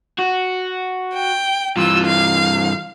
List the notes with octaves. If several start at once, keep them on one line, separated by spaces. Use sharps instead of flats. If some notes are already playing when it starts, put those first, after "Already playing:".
F#4
G5
G2 E3 F4 E6
F5